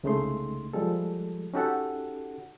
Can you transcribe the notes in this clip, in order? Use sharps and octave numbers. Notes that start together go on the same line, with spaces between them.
C2 C#3 G#3 A3 D#4 C6
F3 G3 G#3 A4
C#4 D#4 F#4 G4 A4 F#5